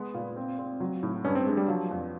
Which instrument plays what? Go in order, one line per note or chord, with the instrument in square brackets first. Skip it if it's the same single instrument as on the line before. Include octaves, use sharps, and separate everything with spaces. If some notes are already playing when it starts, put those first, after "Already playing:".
Already playing: [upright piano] G#3 [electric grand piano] B3
[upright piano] A#2
C4
C4
F#3
A2
[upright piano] G2 [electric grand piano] C#4
[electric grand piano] C4
[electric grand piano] G#3 [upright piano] D4
[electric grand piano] G3
[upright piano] F3 [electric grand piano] F#3
[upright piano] F2